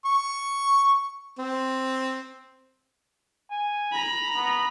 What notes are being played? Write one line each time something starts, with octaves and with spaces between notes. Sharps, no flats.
C#6
C4
G#5
A#5 B5
B3